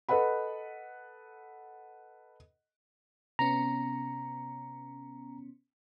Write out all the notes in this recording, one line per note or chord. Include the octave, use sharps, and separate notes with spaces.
A4 B4 D#5 F#5 B5
C3 B3 C#4 A#5